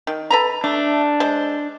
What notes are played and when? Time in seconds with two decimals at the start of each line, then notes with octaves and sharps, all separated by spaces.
0.07 D#3
0.30 A4 B4 A#5
0.64 A3 D4
1.20 G#3 C5